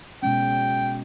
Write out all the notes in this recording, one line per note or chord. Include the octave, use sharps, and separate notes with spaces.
B2 G#3 C#4 G5